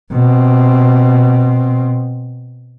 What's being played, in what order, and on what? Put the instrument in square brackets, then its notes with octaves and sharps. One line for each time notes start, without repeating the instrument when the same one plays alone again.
[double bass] B2 C4